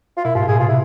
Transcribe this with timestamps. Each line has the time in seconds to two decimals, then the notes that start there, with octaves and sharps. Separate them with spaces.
0.17 F4
0.24 B2 E4
0.35 G#2 F4
0.43 A2
0.48 B2 G#4
0.59 C3 F4
0.69 E4